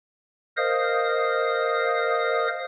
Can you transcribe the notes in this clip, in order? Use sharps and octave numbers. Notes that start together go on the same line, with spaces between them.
A#4 C5 D#5 F5 D#6